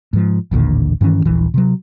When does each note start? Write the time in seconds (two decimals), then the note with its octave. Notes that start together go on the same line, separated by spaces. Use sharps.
0.13 G#2 F3
0.51 A1 D#2 A#2 D3
1.01 G2 D#3 E3 C#4
1.25 D#1 A#1 E3
1.54 C3 F#3